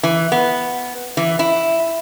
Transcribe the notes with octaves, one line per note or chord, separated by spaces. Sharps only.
E3
B3
E3
E4